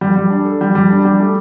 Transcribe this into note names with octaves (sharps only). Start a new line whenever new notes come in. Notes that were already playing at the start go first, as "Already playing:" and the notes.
G3
G3
D4
A4
G3
G3
D4
G3
A3